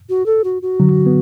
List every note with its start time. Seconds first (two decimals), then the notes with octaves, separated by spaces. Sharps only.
0.09 F#4
0.26 A4
0.44 F#4
0.62 F#4
0.80 D3 F#3
1.06 B3